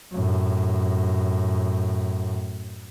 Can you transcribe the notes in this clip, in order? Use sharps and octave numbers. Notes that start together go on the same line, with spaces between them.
F#2 A2